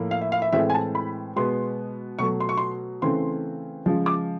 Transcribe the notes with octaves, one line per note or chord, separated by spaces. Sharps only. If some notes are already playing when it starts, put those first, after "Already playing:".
Already playing: A2 F3 A#3
F5
E5
F5
E5
A2 E3 G#3 C4 E5
G#5
A5
B5
B2 G#3 B3 C6
B2 F#3 A3 C#6
C6
C#6
C6
C#3 E3 A3 C4 C6
C#3 F3 G#3
D6